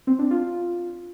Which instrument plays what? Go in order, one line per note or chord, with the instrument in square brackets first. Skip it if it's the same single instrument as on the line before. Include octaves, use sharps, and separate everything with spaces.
[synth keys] C4
D4
F4